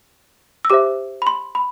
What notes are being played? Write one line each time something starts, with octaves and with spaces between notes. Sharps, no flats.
E6
G4 C5 E5 D6
B5
C6
B5